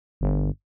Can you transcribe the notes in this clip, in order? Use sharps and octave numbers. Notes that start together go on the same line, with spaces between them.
G1